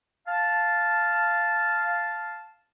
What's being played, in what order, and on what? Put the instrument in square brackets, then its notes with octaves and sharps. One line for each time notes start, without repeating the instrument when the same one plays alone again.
[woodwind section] F5 A5